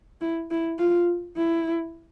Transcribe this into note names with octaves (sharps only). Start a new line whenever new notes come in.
E4
E4
F4
E4